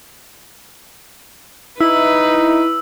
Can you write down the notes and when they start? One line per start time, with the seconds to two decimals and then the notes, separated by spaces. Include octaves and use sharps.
1.80 D#4 E4 B4 E6